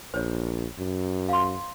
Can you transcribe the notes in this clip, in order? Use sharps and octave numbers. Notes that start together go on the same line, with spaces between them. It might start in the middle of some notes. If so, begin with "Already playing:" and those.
A#1 C5 C#5
F#2
F5 C6